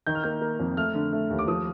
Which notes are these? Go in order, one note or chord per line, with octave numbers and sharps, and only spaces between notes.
D#3 G6
F6
A#3 G6
A#3
F2
A3 F6
D3
A3
D#2
D6
F3 D#6